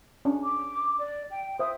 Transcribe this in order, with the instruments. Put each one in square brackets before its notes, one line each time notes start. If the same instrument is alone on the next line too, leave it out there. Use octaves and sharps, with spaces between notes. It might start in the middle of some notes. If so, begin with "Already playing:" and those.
[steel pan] C#4 D4
[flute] D6
D5
G5
[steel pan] C5 E5 [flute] D#6